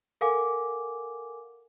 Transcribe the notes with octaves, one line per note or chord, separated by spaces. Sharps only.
A4 A#4 F5 F#5 G#5 D6